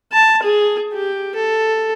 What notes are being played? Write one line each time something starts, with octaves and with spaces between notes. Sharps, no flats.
A5
G#4
G4
A4